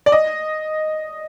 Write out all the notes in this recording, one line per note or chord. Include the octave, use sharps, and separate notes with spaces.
D5
D#5